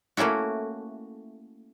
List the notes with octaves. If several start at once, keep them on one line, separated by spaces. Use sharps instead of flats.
A3 A#3 C#4 E4 F#4